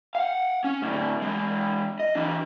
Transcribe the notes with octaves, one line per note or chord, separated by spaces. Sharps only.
F5 F#5
C#4
A2 D3
E3 G#3
D#5
E3 D4